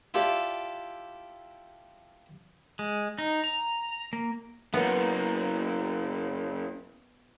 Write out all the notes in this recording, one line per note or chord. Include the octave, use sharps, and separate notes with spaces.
E4 F4 G4 A4 D5
G#3
D#4
A#5
A#3
F#2 A#3 B3